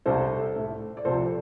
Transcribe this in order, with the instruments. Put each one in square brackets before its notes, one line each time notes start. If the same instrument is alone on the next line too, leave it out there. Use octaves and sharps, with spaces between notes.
[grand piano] C2 C3 G3 A4 C5
A2 A3
D5
C2 C3 F3 A4 C5